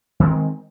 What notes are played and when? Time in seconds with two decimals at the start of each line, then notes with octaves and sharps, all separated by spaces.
0.20 D#3
0.23 G#3
0.27 C4